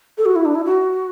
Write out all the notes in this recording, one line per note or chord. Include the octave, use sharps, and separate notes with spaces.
A4
F#4
E4
D4
E4
F#4